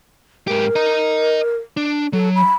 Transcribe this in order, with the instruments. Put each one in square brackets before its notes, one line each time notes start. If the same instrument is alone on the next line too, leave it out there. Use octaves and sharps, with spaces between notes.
[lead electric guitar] G#2 G4 [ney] A#4
[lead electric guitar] D#5 A#5
D4
[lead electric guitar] F#3 [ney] A4
[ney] B5